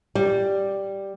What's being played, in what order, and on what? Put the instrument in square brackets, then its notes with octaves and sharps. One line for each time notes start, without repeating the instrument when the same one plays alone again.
[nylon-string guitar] G3